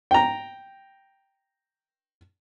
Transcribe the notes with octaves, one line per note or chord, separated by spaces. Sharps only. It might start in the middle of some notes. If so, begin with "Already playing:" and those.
G5 A#5